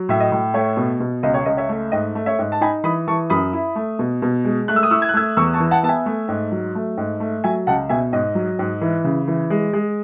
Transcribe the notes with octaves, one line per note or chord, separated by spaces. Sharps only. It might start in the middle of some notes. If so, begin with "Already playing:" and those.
Already playing: F#3
A2 E5
D#5
A2
A3 C#5 E5
B2
B2
C#2 D#5
C#5
C#2 D#5
C#5 E5
A3
G#2 D#5
A3
C#5 E5
G#2
A5
D#4 G#5 B5
E3 B5 D#6
E3 A5 C#6
F#2 B5 D#6
E4
A3
B2
B2
G#3
A3 F#6
E6
D#6
E4 C#6 E6
G#6
F#6
A3 E6 G#6
E2 C#6 E6
A5 C#6
E3
F#5 A5
B3 A5
E5 G#5
A3
G#2
F#3
A3
G#2
A3
F#3 E5 G#5
C#2 F#5 A5
B2 E5 G#5
G#2 D#5
F#3
G#2
E3
C#3
E3
G#3
G#3